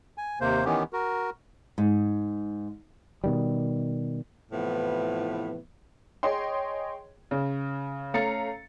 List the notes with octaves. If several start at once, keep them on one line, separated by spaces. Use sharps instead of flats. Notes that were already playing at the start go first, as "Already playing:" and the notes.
G#5
D#2 C3 A#3 C5
D#3 E3 B3 C#4 G4
F#4 A#4
G#2
B2 D#3 G3
A2 C3 E3 F3 B3
G#4 C#5 D#5 G5 C6
C#3
A3 C#4 F5 A#5 A6 C#7